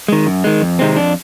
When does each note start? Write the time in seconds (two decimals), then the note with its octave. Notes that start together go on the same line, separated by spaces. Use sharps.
0.08 D#3 G#3
0.26 F#2
0.44 D#3 G#3
0.61 F2
0.79 C3 D#3 G#3 C4
0.96 F2 D4